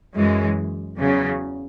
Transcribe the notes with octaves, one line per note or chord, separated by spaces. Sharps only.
F#2 E3 G#3
E2 C#3 F#3